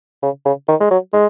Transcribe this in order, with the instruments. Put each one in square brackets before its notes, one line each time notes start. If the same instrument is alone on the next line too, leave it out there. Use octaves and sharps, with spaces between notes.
[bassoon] C#3
C#3
D#3
G#3
F#3
G#3